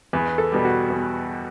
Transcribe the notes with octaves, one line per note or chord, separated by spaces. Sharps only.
E2 B4
A4
B2 G3
F#4
E2